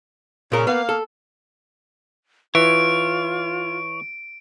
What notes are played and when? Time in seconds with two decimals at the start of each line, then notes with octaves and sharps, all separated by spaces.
0.52 A#2 C#3 A#4
0.67 A#3 B3 F5
0.89 A4
2.55 E3 F4 C#5 D7